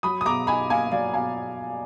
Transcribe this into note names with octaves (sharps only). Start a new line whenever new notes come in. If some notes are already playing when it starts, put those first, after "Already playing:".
F#3 B5 D#6
D#6
B2 A#5 D6
D#4 G#5 B5
A#3 F5 G#5
F#3 D5 F5
B2 F5 G#5